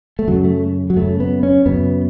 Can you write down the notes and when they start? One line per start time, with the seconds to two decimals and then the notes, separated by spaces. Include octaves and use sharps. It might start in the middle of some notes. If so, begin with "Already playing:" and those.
0.19 A3
0.28 F#2 C#3 F#3
0.44 A3
0.90 F#3
0.96 F#2 C#3 A3
1.20 B3
1.43 C#4
1.66 F#2 C#3 B3